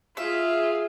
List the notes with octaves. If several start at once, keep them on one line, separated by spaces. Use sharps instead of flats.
F4 G#4 E5